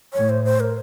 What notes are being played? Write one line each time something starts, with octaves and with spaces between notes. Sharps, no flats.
A2 C#5
C5
C5
A#4